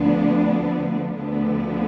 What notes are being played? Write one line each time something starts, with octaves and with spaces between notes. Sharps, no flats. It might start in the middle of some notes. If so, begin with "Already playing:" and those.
Already playing: D2 D3 F3 B3 D4
D2 D3 F3 B3